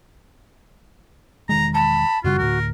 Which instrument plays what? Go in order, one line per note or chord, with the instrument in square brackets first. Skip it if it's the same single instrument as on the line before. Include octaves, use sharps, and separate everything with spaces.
[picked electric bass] E1 D#3 G#3 [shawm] A#5
[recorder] A5 [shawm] B5
[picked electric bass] F#2 C#3 G3 [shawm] F4 [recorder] F#4
[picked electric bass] D2 A2 [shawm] A#4